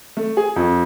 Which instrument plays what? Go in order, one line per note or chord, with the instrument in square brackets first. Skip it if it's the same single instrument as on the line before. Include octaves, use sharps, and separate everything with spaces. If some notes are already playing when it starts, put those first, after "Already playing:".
[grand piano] A3
G#4
F2